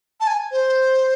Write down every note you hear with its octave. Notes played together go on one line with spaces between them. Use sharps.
A5
G#5
C5